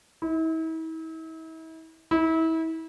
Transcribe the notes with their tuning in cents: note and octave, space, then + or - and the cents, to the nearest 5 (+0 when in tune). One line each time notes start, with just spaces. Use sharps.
E4 -40
E4 -30